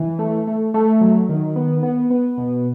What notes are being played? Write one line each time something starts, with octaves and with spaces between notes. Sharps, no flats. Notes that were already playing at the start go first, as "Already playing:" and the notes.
Already playing: E3
A3
A3
A3
F#3
D#3
B3
B3
B3
B2